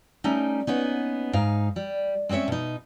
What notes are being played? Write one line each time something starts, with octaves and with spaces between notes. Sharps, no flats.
G3 A3 C#4 D#4
A#3 B3 C#4 D#4
G#2 D#4 F5
G3
G#3 C4 C#4 C#5 E5
B2 D#4